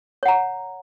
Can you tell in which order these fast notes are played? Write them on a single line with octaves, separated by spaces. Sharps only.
C#5 F#5 A#5